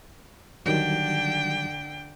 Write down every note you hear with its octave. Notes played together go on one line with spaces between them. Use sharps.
D3 D#3 F#3 G3 G5